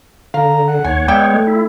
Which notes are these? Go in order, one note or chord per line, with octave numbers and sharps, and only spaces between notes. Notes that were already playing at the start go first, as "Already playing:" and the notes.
D3 F5 A#5
F#5
D#2 C#5 G#5
G#3 B3 C#5 D5 E5 G5
A3
E4